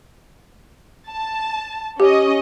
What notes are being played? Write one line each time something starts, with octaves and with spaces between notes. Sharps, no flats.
A5
C#4 G4 D#5